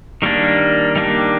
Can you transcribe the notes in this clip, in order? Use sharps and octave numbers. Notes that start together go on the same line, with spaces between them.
D#3 G3 A#3 D4
D#3 G3 A#3 D4